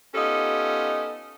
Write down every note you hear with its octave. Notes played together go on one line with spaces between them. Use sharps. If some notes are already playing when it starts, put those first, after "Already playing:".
B3 C#4 D#4 F4 G4 A4